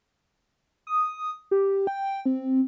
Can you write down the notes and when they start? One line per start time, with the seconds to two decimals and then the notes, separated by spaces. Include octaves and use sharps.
0.87 D#6
1.51 G4
1.87 G5
2.26 C4